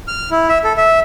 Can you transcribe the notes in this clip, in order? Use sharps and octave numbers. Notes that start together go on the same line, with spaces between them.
F6
E4
E5
A4
E5